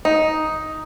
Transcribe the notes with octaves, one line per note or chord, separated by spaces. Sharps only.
D#4